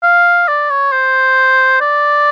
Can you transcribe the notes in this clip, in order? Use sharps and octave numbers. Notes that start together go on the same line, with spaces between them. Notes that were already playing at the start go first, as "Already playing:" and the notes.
F5
D5
C#5
C5
D5